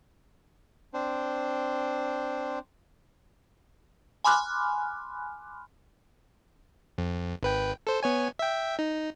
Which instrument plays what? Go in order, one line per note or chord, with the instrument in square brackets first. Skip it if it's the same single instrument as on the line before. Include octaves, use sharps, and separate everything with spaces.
[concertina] C4 D4 C5
[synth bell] G#5 B5 C6 D6 F6 F#6
[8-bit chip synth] F2
G#1 B4 G5
A4 C5
B3 C#5 G#5
E5 G5
D#4